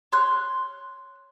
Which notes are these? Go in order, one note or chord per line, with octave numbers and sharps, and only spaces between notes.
C#5 C6 F6 F#6